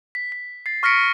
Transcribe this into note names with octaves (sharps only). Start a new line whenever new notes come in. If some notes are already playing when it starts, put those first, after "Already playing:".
B6
B6
A6 C7
C#6 F6 A#6 B6 C#7 D7